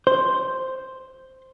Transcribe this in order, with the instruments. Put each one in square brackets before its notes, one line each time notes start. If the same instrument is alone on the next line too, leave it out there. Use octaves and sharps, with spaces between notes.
[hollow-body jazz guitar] C5